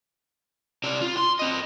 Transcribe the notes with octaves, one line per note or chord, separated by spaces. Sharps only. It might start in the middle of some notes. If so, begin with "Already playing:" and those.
C3 D5
F4
C6
C4 D#5